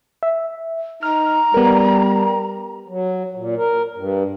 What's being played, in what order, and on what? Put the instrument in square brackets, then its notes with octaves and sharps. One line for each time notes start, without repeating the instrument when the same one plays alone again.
[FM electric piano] E5
[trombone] D#4 [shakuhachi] A#5 [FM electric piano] F6
[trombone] G3 [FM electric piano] B3 A#4
[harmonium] F#3
A#2
A#4
G2